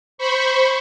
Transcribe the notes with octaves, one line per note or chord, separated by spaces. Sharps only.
C5 B5 C#6